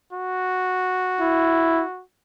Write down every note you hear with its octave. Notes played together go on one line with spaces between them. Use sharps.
F#4
E4